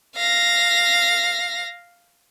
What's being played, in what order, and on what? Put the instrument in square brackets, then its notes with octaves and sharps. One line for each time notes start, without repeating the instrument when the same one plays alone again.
[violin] F5 A#6